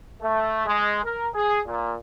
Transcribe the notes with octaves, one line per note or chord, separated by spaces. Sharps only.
A3
G#3
A#4
G#4
A#2